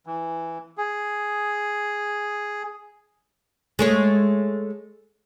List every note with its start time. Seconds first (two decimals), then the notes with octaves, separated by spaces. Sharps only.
0.06 E3
0.78 G#4
3.79 G#3 A3 C#5